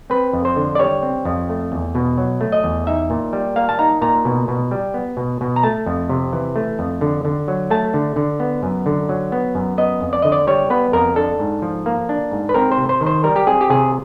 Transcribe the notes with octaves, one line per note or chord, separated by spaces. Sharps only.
C4 B4
F2
C5
D3
D5
G3 C#5
C4
F2
A3
E2
B2
F#3
A3
D#5
E2
D#4 E5
A#2
G3
A#3 F5
A5
D#4 A#5
A#2 A#5
B2
B2
G3
B3
B2
B2
A#5
A3 A5
F2
C3
E3
A3
F2
D3
D3
F#3
A3 A5
D3
D3
B3
F#2
D3
F#3
B3
F#2
B3 D#5
F2
D5
D3 D#5
D5
G3 C#5
B3 B4
F2 A#4
D4 A4
G#2
F3
A#3
D4
G#2
B4
C4 A#4
C5
C3
C5
D#3
C5
G3 A#4
G4
C4 G#4
G4
C3 G#4